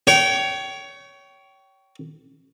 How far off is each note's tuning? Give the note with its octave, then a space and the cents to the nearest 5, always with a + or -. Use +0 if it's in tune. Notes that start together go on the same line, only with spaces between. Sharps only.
C#5 +15 G5 -25